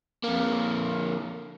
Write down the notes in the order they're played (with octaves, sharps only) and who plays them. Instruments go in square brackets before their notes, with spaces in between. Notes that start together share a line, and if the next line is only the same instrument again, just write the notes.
[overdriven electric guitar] F2 A#3